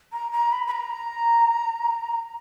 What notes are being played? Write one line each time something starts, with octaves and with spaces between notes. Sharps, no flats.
A#5
A#5
B5
B5
A#5